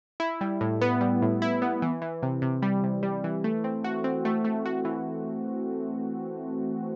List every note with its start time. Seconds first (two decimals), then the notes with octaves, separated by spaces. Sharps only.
0.20 E4
0.41 G3
0.61 A2
0.81 B3
1.01 G3
1.22 A2
1.42 E4
1.62 B3
1.82 E3
2.02 E3
2.22 C3
2.42 C3
2.62 G3
2.83 C3
3.03 G3
3.24 E3
3.44 A3
3.64 C4
3.84 F#4
4.04 C4
4.25 A3
4.44 A3
4.66 F#4
4.85 E3